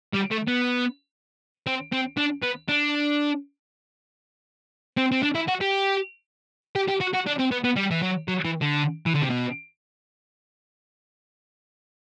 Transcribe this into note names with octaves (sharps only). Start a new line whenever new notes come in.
G3
A3
B3
C4
C4
D4
B3
D4
C4
C4
D4
E4
F#4
G4
G4
G4
F#4
F#4
D4
C4
B3
B3
G3
E3
F#3
F#3
E3
D3
E3
D3
C3
B2